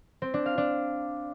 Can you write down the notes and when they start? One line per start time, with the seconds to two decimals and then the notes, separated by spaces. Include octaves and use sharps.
0.22 C4
0.34 D4
0.46 F5
0.58 D4